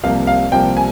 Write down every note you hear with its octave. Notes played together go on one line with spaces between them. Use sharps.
C2 C3 F3 A#3 F5
F5
C2 C3 F3 A#3 G5
G#5